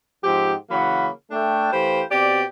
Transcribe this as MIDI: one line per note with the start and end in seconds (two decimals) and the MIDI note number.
0.24 0.53 44
0.24 0.53 53
0.24 0.53 60
0.24 0.53 67
0.70 1.08 49
0.70 1.08 52
0.70 1.08 54
0.70 1.08 58
0.70 1.08 78
0.70 1.08 83
1.31 1.69 57
1.31 1.69 62
1.31 1.69 79
1.72 2.02 52
1.72 2.02 57
1.72 2.02 67
1.72 2.02 72
1.72 2.02 77
1.72 2.02 83
2.11 2.43 47
2.11 2.43 60
2.11 2.43 67
2.11 2.43 74